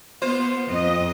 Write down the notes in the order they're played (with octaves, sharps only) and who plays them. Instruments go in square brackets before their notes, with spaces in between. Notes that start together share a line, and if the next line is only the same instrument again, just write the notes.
[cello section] B3 [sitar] F4 C5
[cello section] F2 D#5